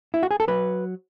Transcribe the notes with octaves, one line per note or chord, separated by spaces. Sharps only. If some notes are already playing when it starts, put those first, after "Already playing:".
E4
F#4
G#4
A4
F#3 B4